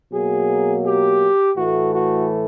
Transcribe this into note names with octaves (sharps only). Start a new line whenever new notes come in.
B2 F#3 A#3 G#4
G4
A2 E3 A3 F#4
F#4